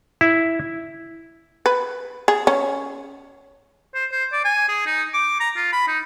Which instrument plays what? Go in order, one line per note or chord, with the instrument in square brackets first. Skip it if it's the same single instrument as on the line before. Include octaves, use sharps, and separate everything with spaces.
[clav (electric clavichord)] E4
[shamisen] B4
G#4
C#4
[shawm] C5
C5
D5
G#5
G#4
D#4
D6
A#5
F4
B5
D#4